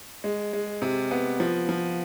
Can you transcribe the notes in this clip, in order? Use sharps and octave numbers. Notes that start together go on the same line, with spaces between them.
G#3
G#3
C3
B3
F3
F3